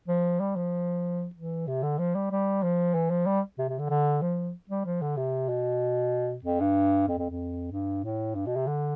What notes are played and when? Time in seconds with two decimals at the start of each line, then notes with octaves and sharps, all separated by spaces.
0.08 F3
0.40 G3
0.56 F3
1.35 E3
1.67 C3
1.83 D3
1.99 F3
2.15 G3
2.31 G3
2.63 F3
2.94 E3
3.10 F3
3.26 G3
3.58 C3
3.69 C3
3.79 D3
3.90 D3
4.22 F3
4.70 G3
4.85 F3
5.02 D3
5.17 C3
5.49 B2
6.44 F2
6.60 G2
7.08 F2
7.19 F2
7.30 F2
7.72 G2
8.04 A2
8.35 G2
8.46 B2
8.56 C3
8.67 D3